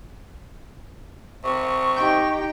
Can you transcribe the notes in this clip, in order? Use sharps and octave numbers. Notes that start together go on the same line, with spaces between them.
C3 C#6
D#4 G4 G5